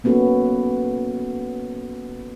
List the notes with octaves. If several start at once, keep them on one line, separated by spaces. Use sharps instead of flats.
A#3 B3 C#4 F#4 A4